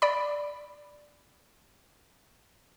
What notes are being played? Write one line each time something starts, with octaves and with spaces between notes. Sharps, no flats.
D5 B5